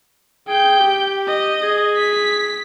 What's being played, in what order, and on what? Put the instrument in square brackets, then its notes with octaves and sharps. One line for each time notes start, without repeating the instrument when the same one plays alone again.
[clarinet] G#4 [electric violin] G5 G6
[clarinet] G4
[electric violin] D#5
[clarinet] G#4
[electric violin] B6